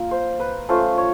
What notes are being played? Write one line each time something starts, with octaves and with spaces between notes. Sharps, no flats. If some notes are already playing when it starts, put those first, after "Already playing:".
Already playing: A#3 F4
C5
B4
A3 C#4 F4 C5
C#5